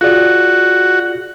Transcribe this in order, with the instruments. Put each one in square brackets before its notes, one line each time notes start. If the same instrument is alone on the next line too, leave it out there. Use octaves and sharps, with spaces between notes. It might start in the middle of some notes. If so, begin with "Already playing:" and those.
[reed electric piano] F4 G#4 D5 [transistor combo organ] F#4